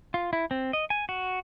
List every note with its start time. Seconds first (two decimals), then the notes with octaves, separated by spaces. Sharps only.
0.14 F4
0.33 E4
0.51 C4
0.73 D#5
0.90 G#5
1.09 F#4